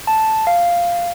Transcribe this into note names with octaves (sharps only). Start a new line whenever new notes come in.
A5
F5